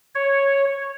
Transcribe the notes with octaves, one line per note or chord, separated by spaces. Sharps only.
C#5